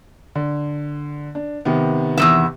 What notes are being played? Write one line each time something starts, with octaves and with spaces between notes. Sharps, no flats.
D3
D4
C3 D#3 B3
E2 G#2 E5